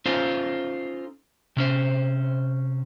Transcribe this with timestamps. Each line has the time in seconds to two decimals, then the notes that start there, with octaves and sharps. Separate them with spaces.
0.06 C#4 D#4 F4 A4 C5
1.57 C3 C#4 C5